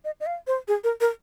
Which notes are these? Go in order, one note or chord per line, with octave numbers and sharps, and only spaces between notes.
D#5
D#5
F5
C5
G#4
A#4
A#4